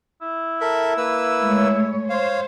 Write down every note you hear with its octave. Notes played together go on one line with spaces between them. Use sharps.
E4
A4 A#4 E5
A#3 B4 E6
G#3 A3 C#5
C5 C#5 F5